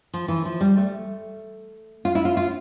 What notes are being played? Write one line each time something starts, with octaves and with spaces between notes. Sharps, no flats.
F3
E3
F3
G3
A3
F4
E4
F4
F4